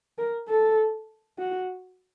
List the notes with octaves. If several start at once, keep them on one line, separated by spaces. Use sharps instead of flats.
A#4
A4
F#4